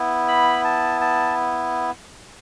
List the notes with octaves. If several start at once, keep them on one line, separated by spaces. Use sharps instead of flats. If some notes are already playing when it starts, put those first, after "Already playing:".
Already playing: B3 E4
B5
A5
A5